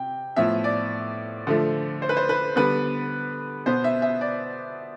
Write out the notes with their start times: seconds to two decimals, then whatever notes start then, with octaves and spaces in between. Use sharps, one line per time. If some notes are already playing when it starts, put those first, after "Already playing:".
Already playing: C3 G5
0.36 A2 F3 B3 E5
0.64 D5
1.47 D3 F3 A3
2.02 C5
2.09 B4
2.17 C5
2.29 B4
2.56 D3 G3 B3 B4
3.66 B2 B3 C5
3.84 E5
4.02 E5
4.21 D5